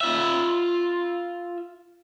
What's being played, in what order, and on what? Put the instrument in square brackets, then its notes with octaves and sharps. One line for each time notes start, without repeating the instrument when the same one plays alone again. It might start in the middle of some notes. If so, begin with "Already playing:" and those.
[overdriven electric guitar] F4 E5